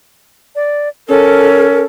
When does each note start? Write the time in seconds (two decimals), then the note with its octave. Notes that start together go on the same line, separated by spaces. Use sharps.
0.55 D5
1.09 C#4 A4 A#4